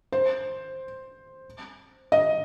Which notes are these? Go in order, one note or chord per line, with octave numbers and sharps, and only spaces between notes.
C5
D#5